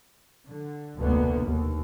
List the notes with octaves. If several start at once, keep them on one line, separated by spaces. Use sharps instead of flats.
D3
F1 D2 B2 D3 A#3 B3
D#2